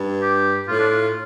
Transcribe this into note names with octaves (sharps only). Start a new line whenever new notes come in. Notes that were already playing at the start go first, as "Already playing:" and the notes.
Already playing: G2
G4
A2 F4
D4
F4
F4